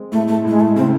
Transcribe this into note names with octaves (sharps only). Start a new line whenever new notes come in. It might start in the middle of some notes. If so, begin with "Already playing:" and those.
Already playing: G#3 C4
A2 A3
A3
A2 G#3
A3
C#3 C4